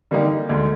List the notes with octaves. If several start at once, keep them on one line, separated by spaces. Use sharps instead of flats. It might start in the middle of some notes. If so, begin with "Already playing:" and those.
D3 G3 A#3 D#4 G4
D2 D3 G#3